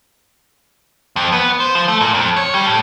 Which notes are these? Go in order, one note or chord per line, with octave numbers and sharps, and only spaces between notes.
F2
B3
C5
F3
A3
A#2
F2
C#5
G3
A2